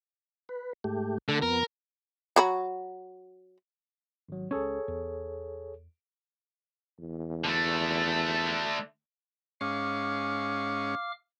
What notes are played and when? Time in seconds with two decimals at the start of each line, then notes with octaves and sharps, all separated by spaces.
0.49 B4
0.84 G#2 A3 G4
1.28 D3 A3 A4 F#6
1.42 F2 B3 A#4
2.36 F#3 F#4 B5
4.29 G#1 F#3
4.51 C#2 C#4 G#4 A4 C#5
4.88 E2
6.99 E2
7.44 D3 A3
9.61 G#2 C#4 F5 C#6 D6 F6